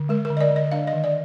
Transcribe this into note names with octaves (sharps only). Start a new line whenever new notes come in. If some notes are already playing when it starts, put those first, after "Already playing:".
Already playing: D3
G#3 A#4
A#4
D3
D#5
D5
D3
D#5
D4 F5
D#5
D#3
D5